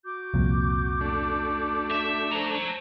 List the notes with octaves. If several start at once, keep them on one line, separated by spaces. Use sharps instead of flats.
F#4 D6 G6
C2 F2 A#2
A3 D4
E5
C5 C#5 A5 A#5